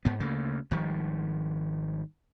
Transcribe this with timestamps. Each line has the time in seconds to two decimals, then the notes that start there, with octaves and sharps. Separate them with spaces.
0.05 G#2 B3
0.20 D2 C#3 A3 A#3
0.71 G#1 D#3 F3 G3